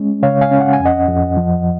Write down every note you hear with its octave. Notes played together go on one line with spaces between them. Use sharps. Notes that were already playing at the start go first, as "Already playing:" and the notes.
Already playing: G#3 C#4
C#3 C#5 F5
F5 G#5
C#4
F#5
G#5
F2
D#5 F#5
F2
F3